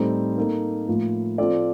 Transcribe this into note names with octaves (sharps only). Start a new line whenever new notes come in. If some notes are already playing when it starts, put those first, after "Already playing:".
Already playing: A2 G3 C4 D#4 A4
A#3 D#4 A4
A2 F3 A#3
F3 C4 F4 A4 D5